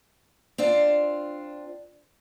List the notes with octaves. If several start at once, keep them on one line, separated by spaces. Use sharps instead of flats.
C4 D4 F4